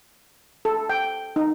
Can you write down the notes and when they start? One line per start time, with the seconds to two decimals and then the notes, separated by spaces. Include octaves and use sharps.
0.65 A4
0.90 G5
1.36 D#4